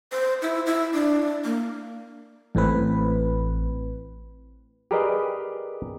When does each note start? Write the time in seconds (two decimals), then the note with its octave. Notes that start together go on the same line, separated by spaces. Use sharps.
0.12 C5
0.42 E4
0.67 E4
0.94 D4
1.44 A#3
2.55 A1 A2 C4 B4
4.91 G4 G#4 A#4 B4 D5 D#5